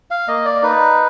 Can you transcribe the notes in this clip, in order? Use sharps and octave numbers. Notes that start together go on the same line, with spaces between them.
F5
A#3 D#5
D5
D#4 B4